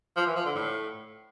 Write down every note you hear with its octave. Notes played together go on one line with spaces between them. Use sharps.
F3
E3
F3
D3
A2